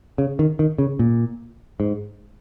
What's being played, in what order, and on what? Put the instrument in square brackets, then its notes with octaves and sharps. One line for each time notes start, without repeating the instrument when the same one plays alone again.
[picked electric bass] C#3
D#3
D#3
C#3
A#2
G#2